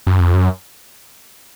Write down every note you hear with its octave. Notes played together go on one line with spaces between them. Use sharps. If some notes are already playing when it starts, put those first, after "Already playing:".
F#2
F2
F#2